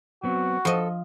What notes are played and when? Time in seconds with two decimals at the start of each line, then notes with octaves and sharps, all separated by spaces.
0.24 F#3 B3 C4 F#4
0.65 F3 A4 D#5